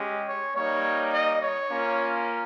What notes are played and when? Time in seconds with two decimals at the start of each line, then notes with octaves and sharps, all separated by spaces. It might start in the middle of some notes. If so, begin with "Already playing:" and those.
Already playing: G#3 C#4 G4
0.28 C#5
0.56 G3 A#3 D#4 C#5
1.14 D#5
1.43 C#5
1.71 A#3 C#4 F4